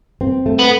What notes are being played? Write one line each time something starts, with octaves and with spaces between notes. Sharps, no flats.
C4
A3
B3